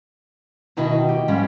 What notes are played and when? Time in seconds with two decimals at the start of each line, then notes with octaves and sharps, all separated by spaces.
0.77 B2 D#3 D#4 E4 F#4
1.09 G4
1.28 G#2 F3 G3 C#4